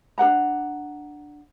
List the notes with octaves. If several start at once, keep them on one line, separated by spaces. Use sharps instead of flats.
D4 A#4 F#5 A#5